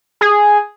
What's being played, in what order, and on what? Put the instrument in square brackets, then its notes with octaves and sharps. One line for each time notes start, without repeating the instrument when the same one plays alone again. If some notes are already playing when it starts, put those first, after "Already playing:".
[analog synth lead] G#4